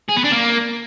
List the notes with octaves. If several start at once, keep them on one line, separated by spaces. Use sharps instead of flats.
G#4
B3
D4
A#3